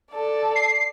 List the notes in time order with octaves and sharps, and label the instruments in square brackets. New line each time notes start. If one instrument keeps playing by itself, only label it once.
[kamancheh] A4 D5
[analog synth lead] C7